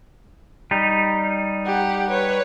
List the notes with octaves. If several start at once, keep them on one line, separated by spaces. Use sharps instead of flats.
G3 D#4
G4 F#5
B4 C#5